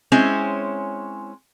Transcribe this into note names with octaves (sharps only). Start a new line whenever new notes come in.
G#3 C4 C#4 E4 C#5